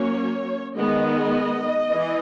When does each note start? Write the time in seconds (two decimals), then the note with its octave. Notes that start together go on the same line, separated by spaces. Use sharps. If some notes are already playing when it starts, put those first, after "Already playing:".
Already playing: F#3 A#3 C#4 C#5
0.76 D#3 G#3 B3 D#5
1.91 E3